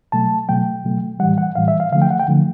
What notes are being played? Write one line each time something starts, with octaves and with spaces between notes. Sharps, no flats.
B2 F#3 A3 A5
B2 F#3 A3 G5
B2 F#3 A3
A2 E3 G3 F#5
F#5
A2 E3 G3 F5
E5
F5
D3 F3 A3 F5
G5
F#5
G5
D3 F3 A3